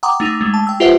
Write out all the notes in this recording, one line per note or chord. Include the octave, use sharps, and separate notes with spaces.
F#5 G5 A#5 C6 D6 D#6
A3 D#4 F7
G#3 A3
A5
G5 E6
F4 G4 B4 C5 E5 F#5